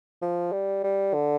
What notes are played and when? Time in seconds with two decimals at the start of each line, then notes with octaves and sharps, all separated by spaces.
0.22 F3
0.52 G3
0.84 G3
1.14 D3